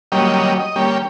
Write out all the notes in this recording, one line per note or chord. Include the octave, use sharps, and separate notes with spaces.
F#3 G3 A#3 C#4 G4 D#5
D#5
G3 A#3 C#4 G4